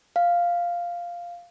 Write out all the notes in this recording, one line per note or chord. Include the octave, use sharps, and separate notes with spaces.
F5